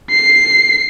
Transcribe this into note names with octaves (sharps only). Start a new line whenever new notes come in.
C7